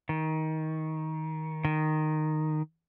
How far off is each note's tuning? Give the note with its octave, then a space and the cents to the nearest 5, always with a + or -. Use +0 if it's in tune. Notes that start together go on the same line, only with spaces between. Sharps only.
D#3 +20
D#3 -10